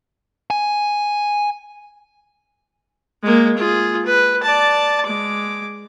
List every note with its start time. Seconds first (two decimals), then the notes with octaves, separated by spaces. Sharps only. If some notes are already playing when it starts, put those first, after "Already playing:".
0.50 G#5
3.23 G#3 A#3
3.57 F4 G#4
4.06 B4
4.43 D5 A5
5.06 G#3 D6